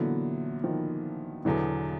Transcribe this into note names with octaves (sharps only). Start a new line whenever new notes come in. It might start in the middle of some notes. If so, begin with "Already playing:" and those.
Already playing: A#2 D3 E3 F#3 B3
D#3 F3
E2 B2 D3 E3 F#3